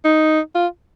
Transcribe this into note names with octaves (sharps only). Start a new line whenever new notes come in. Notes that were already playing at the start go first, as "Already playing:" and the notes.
D#4
F4